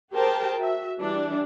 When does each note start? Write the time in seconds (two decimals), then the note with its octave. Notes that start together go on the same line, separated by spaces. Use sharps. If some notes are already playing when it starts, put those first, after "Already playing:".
0.12 G4 G#4 A#4 C5 G5 A5
0.58 F#4 E5
0.99 E3 G3 D4